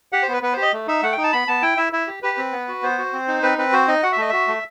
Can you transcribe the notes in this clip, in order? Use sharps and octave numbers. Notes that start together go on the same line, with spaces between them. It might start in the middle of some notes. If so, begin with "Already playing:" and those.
G4 F#5
C5
B3 B4
B3 B4
G4 C5
D#5
A3
D#4 E5
A3 F#5
G5
D#4
A5
B3 B5
B3 A5
E4 G5
E4 E5
E4 E5
G4
G4 B4
C4
B3
F#4
B3 C5
F#4
C4
D#4
C4 B4
C4 B4
F#4 C5
D#4 D#5
F#4 F#5
E5
A3 D#5
F#4 E5
A3